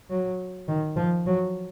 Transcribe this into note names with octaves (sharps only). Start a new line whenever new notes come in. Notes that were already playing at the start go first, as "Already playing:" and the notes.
F#3
D#3
F3
F#3